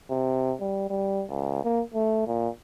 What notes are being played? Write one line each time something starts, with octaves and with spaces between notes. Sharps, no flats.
C3
G3
G3
C#2
A#3
A3
A#2